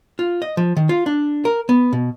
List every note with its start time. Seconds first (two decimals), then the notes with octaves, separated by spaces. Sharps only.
0.19 F4
0.42 D#5
0.57 F3
0.77 D#3
0.89 F4
1.06 D4
1.45 A#4
1.69 B3
1.93 B2